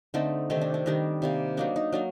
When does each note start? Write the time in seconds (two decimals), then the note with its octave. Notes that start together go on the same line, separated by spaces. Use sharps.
0.14 D3 A3 C4 D#4
0.50 C3 D#3 A3 C4 D#4
0.62 D4
0.74 D4
0.86 D#3 G3 D4 D#4
1.22 C3 G3 A#3
1.57 F#3 A#3 D4 D#4
1.76 D#4
1.93 F#3 A#3 D4